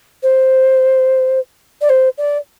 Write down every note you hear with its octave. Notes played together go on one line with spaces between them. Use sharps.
C5
D5
C5
D5